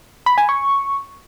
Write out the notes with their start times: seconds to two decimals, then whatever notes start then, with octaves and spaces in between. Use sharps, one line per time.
0.26 B5
0.38 G#5
0.49 C#6